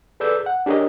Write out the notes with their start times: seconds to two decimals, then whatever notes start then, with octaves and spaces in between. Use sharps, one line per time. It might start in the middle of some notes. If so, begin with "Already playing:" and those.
0.20 G#4 A4 B4 D5 E6 G6
0.46 F#5
0.66 D4 G4 G#4 A#4 C#5 D#5